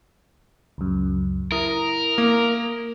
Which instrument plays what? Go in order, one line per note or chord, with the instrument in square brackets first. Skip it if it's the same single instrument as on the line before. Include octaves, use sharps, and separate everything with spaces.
[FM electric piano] C#2 F#2
[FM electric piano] E4 A#5 D#6 [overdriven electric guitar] A#4
[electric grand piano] A#3